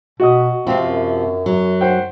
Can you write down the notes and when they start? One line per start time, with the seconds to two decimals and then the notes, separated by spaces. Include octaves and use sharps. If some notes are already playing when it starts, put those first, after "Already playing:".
0.20 B2 F#4 D#5 D#6
0.67 C3 F3 C4
0.84 F#2
1.46 F#3
1.81 C5 F#5 G5